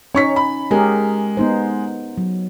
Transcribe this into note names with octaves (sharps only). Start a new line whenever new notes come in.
C#4 D#4 C#5 C#6 B6
B5
G#3 G4 G#4 A#4
B3 D#4 C5
F#3